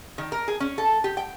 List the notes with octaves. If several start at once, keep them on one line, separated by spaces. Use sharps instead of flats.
D#3
A#4
G#4
C#4
A4
G4
G5